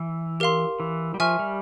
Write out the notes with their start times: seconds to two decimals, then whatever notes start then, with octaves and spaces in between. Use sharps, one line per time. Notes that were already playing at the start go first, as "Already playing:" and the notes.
Already playing: E3
0.40 G4 A#4 F5 C6
0.80 E3
1.14 G3
1.20 F3 E5 G#5 C#6 F6
1.39 G3